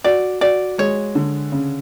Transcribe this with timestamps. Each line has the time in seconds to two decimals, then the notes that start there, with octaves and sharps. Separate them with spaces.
0.04 F#4 D5
0.41 F#4 D5
0.78 G#3 C#5
1.15 D3
1.52 C#3